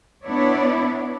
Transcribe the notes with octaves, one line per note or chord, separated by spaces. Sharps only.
B3 D4 E4 C#5 D5